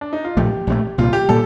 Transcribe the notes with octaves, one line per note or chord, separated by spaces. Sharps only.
D4
D#4
F4
A#1 A2 F3 A3 G4
A#1 A2 F3 A3
C2 A#2 G3 F4
G4
A#2 G3 A4